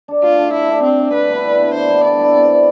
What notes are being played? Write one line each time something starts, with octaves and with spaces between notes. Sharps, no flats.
D4 A4
A3 F4
D4 A4
A3 E4
D4 A4
A3 C4
D4 A4
D3 B4
G3 B3 E4
D3
G3 B3 E4
D3 C5
G3 B3 E4
D3 D5
G3 B3 E4
C3
G3 C4